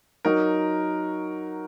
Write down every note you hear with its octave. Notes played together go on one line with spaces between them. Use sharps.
F#3 D#4 F#4 A#4